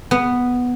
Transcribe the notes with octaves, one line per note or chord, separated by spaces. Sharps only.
B3